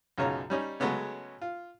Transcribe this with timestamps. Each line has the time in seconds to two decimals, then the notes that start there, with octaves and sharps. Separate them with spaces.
0.18 B1 F#2 C#3 F4 C#5 A#5
0.50 G3 C#4 D#4
0.80 C#3 F#3 G#3 A3 B3 C#4
1.41 F4